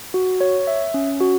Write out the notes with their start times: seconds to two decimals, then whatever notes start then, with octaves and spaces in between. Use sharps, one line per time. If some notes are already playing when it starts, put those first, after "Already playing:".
0.14 F#4
0.41 C#5
0.67 E5
0.94 C#4
1.20 F#4